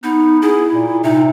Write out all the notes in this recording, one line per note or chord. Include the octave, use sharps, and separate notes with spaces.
B3 D#4
E4 G#4
A#2
C3 D#4